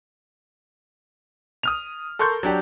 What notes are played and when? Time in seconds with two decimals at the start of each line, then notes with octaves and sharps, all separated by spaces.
1.63 D#6 F6 F7
2.19 A4 A#4 C6 C#6 G6
2.43 F#3 D4 G4